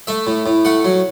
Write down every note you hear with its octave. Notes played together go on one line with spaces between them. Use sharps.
A3 E5
A2
A2
A3 F#5
F#3